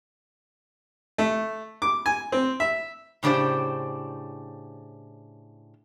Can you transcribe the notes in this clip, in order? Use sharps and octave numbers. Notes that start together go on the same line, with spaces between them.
A3
D6
G#5
C4
E5
A2 C#3 D4 G4 C5